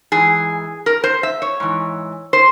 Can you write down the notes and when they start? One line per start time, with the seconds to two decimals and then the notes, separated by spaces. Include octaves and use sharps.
0.12 G#2 E3 G#4
0.86 A#4
1.04 C5
1.23 E5
1.42 C#5
1.60 G#2 E3
2.33 C5